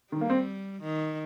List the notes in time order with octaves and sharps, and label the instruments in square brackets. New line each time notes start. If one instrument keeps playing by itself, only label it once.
[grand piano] D#3 [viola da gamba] G3
[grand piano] A#3
C4
[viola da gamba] D#3